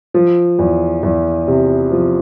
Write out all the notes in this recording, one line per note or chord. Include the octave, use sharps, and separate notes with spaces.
F3
E2
E2
C3
F3